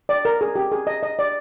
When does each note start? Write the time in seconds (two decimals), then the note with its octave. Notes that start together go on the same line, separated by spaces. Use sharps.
0.09 D5
0.25 A#4
0.41 G#4
0.56 G4
0.72 G#4
0.87 D#5
1.03 D#5
1.19 D5